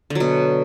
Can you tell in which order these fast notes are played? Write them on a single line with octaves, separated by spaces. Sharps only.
D3 F#3 B2